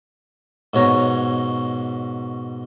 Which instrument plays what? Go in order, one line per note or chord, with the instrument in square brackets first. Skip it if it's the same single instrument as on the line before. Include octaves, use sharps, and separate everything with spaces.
[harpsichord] G#2 B2 C#5 A#5